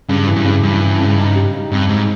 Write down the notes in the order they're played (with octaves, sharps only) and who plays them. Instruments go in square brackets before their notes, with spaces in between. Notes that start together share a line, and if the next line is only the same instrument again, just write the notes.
[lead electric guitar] G2 [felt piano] C#3
[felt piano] E3
[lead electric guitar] G2
[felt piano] C#3
[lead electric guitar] G2 [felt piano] E3
[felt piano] E3
C#3
D#4
G3
D#4
[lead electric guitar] G2 [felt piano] C4
[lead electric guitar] G#2 [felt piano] D#4